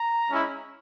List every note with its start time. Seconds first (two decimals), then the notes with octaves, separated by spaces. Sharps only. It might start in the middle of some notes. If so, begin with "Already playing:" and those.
Already playing: A#5
0.28 G#3 C#4 E4